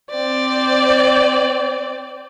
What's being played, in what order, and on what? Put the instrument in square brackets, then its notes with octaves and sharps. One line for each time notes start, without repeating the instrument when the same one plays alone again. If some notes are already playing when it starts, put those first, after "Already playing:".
[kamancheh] C4 D5